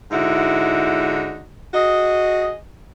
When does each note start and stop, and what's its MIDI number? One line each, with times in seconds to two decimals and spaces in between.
0.11 1.43 44
0.11 1.43 50
0.11 1.43 63
0.11 1.43 64
0.11 1.43 66
1.74 2.54 66
1.74 2.54 68
1.74 2.54 75